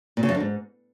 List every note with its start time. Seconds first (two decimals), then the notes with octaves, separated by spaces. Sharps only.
0.17 A#2
0.23 C#3
0.29 F#2
0.35 D3
0.40 G#2